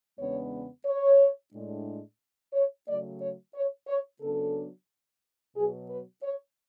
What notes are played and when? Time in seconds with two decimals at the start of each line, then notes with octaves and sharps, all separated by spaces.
0.19 E2 C#3 G#3 B3 D4 C#5
0.86 C#5
1.53 A2 G#3 D4
2.54 C#5
2.87 C#3 F#3 A3 D5
3.20 C#5
3.55 C#5
3.88 C#5
4.21 C#3 F#3 B3 D4 A4
5.56 B2 F#3 B3 G#4
5.89 B4
6.23 C#5